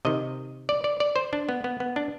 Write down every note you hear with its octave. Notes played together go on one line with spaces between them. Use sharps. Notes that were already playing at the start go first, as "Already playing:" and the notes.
C3 D#3 D#5
D5
D5
D5
C5
D4
B3
B3
B3
D4